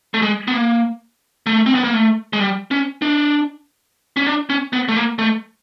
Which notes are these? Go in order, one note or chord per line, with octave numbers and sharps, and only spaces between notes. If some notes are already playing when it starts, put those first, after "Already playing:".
A3
G#3
B3
A#3
A3
C4
B3
A#3
A3
G#3
G3
C#4
D4
C#4
D4
C#4
B3
A3
A#3
A3